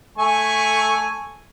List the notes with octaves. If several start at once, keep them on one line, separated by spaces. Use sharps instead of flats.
A3 G#5 C#6